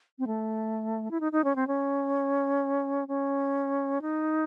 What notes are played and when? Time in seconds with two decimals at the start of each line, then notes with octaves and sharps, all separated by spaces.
0.19 C4
0.27 A3
1.11 E4
1.20 D#4
1.32 D#4
1.44 C#4
1.56 C4
1.67 C#4
3.08 C#4
4.02 D#4